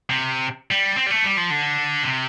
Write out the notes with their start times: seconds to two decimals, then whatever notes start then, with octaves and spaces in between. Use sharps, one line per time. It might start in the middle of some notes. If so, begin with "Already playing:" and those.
0.10 C3
0.71 G3
0.97 C4
1.06 G3
1.11 A3
1.24 G3
1.37 F3
1.50 D3
2.03 C3